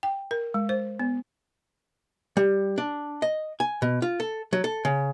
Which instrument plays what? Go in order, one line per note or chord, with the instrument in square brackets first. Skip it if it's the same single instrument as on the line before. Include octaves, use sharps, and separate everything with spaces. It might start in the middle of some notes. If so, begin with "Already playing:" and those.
[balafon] G5
A#4
G#3
C5
B3
[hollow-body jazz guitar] G3
D4
D#5
G#5
B2
F4
A4
F#3
A4
C#3